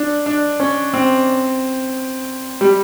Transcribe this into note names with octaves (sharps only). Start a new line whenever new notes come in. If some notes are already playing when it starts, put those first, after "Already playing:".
Already playing: D4
D4
C#4
C4
G3